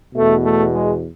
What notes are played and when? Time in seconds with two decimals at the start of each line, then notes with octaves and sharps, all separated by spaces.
0.15 E2 B2 A3
0.43 A3
0.72 G#3